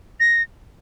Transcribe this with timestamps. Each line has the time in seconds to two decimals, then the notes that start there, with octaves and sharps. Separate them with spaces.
0.20 A#6